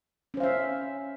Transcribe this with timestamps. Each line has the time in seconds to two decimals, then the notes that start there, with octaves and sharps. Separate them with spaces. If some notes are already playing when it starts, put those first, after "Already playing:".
0.34 C#4
0.37 C5
0.40 F5
0.43 E5